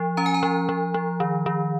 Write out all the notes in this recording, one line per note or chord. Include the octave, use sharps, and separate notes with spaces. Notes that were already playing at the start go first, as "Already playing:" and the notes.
Already playing: F3
C#4 A#5
G#5
A#5
F3
F3
F3
D#3
D#3